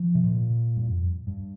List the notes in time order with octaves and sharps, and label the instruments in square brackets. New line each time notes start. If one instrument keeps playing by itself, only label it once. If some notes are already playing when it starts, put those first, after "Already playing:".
Already playing: [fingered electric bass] F3
C3
A#2
G2
F2
G2